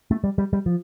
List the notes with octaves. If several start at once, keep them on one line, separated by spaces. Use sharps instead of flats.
A3
G3
G3
G3
F3